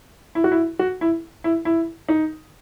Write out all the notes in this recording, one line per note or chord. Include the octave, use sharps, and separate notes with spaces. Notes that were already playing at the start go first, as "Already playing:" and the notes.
E4
F#4
E4
F#4
E4
E4
E4
D#4